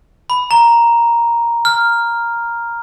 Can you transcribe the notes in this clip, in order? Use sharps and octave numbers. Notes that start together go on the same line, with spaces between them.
B5
A#5
F6